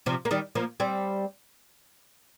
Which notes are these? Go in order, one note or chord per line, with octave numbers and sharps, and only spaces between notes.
C3 F3
A#3
D#3 G3
F3 A#3
G3 C4